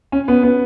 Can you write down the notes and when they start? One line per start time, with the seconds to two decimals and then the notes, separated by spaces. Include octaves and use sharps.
0.12 C#4
0.28 B3
0.43 B3